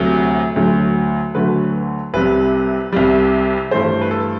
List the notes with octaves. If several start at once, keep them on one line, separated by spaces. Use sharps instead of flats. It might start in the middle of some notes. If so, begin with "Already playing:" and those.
Already playing: D2 C3 F#3 A3
D2 D3 F#3 A3
D2 D3 F#3 A3 B4
C2 C3 G3 B4
C2 C3 G3
G2 E3 A3 C5
B4
A4